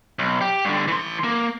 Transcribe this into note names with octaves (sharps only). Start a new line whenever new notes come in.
B1
G4
G2 D3
E3 C6
A#3